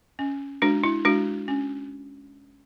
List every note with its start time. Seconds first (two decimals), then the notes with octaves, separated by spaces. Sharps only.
0.19 C#4
0.62 G#3 D4 F#4
0.83 E4
1.05 G#3 D4 F#4
1.48 C#4